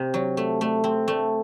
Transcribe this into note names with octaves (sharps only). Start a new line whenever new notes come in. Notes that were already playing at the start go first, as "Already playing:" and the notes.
Already playing: C3
F#3
A3
A3
C4
A3